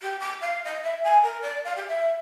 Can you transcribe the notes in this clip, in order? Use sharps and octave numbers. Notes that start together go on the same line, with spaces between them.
G4
D6
F5
D#5
E5
G#5
A#4
D5
F5
G4
E5